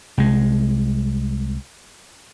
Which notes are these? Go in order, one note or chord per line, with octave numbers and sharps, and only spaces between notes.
C2 G#3